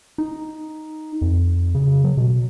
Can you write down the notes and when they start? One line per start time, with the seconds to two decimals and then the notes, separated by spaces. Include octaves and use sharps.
0.18 D#4
1.22 F2
1.75 C#3
2.04 F#3
2.17 B2